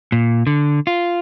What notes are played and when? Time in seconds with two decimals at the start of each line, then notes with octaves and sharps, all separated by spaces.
0.12 A#2
0.47 D3
0.87 F4